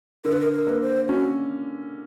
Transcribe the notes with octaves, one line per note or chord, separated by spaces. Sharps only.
D3 A#4
B4
A#4
A#4
A#3 B4
C5
C#4 F#4